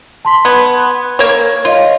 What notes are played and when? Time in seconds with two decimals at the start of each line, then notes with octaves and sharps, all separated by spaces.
0.25 A5 C6 B6
0.45 B3 G#6
1.19 A#3 C#5
1.65 F4 C#5 D#5 F5